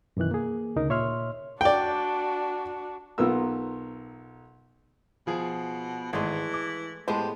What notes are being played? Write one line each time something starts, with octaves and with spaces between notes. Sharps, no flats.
F#2 B2 D#3 E3 F#6
A#3 G#4
D2 C#3 D#4 A#4
A#2 C#5 E5 C6 F6
D4 F#4 D5 G5
B1 B3 F4 A#4 E6
B2 F3 G#4
G#1 E3 G#3 A3
D6
A2 G#3 B3 G4 C5 A5